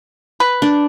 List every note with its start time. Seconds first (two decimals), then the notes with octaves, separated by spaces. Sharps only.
0.40 B4
0.62 D4